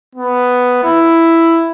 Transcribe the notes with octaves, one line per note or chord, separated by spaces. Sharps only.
B3
E4